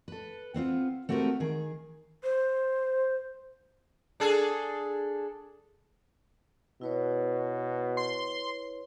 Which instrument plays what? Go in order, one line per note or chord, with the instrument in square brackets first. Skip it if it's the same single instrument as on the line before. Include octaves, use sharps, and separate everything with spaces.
[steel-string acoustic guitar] A4 B4
B3 C4 D4 F4
A3 C4 F#4 G4 A#4 B4
D#3 G#4
[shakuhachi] C5
[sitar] D4 G#4 A4
[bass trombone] B2 [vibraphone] E4 B4 C#5
[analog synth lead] C6